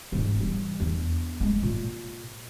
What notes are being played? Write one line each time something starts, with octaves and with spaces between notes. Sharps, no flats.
E1 G#2
E3 G3
E2 D4
G#3 A#3
A#2